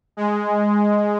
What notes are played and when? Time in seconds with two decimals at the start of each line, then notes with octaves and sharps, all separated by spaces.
0.17 G#3